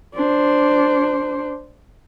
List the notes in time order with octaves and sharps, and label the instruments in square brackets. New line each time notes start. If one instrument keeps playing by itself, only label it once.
[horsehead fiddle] D4 C5